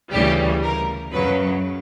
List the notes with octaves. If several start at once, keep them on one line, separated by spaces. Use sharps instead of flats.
D2 C#3 E3 G3 G4
A#4
F#2 C#3 F#3 B4